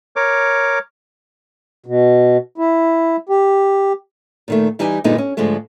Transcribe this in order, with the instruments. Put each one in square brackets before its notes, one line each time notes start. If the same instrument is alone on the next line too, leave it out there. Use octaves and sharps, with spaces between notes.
[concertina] A#4 C#5 D6
[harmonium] B2
E4
G4
[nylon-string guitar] A#2 D#3 A3
E3 G3 D#4 G4 G#5
G2 A#2 D3 G#3 B3 D#4
C#4
G#2 D3 F3 G#3 A3